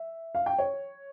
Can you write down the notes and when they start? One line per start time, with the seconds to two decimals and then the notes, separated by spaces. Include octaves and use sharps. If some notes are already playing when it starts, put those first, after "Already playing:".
Already playing: E5
0.35 F5
0.46 G5
0.58 C#5